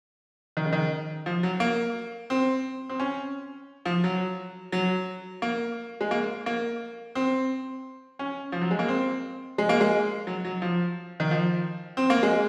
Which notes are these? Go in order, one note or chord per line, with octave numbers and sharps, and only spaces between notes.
D#3
C#3
D#3
F3
F#3
A#3
C4
C4
C#4
F3
F#3
F#3
A#3
G#3
A#3
A#3
C4
C#4
F3
F#3
G#3
A#3
C4
G#3
A#3
G#3
F#3
F#3
F3
D#3
F3
C4
A#3
G#3